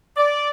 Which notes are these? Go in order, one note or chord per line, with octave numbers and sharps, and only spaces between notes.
D5